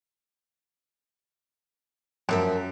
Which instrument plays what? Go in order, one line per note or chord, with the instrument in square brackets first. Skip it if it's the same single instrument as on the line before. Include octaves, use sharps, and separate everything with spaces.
[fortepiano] F#2 [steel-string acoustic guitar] F3 A#4 E5